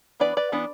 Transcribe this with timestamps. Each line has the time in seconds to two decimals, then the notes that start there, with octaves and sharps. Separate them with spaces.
0.20 E3 B3 D4 B4 D5
0.37 B4 D5
0.52 E3 B3 D4